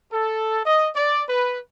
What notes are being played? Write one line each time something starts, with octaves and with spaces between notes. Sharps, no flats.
A4
D#5
D5
B4